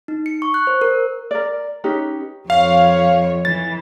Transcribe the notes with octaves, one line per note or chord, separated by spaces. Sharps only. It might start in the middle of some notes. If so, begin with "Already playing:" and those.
D#4
C#7
C#6
F#6
C5
A#4
A#4 D5
C#4 D#4 G4 B4
F2 C#5 F5
E3 A6